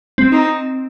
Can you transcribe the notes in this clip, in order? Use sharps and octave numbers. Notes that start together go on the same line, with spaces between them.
C4
D#4